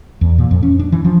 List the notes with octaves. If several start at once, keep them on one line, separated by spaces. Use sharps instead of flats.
E2
A#2
F2
C#4
D4
E3
F3